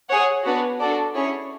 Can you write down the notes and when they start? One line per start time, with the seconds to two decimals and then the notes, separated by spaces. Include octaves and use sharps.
0.09 G#4 C#5 F#5
0.45 B3 D4 F#4 B4
0.79 D4 F#4 A4 D5
1.15 C#4 E4 G#4 C#5